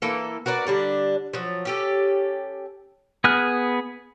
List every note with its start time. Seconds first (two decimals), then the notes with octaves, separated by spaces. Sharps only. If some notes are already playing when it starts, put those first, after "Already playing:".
0.02 E3 A#3 A4
0.46 F#4 A#4 B4 D5
0.67 D3 G3 D4
1.33 F3 F#3
1.65 C#4 G4 A4
3.24 B3 G#4 F6 F#6